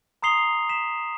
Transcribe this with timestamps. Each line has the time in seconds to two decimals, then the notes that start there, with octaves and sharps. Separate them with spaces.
0.22 A#5 C6 D#6 C7 F7 G7
0.69 B6 E7